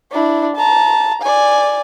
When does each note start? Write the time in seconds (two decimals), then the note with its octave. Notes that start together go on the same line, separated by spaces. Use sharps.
0.11 D4 E4
0.57 A5 A#5
1.22 D5 G#5